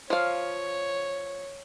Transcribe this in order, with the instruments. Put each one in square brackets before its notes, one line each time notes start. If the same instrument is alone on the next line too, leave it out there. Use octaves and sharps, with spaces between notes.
[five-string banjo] F3 F5 [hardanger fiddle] C#5